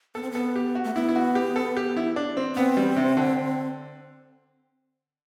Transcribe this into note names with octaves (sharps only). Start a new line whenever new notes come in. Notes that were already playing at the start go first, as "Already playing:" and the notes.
B3 A4
C4
B3 A4
G4
F#4
A3
B3 E4
E4
F#4
G4
A4
G4
E4
D4
C4
B3 C4
G3
C3
D3